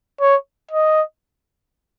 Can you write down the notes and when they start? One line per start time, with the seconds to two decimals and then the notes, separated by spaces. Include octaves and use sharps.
0.21 C#5
0.71 D#5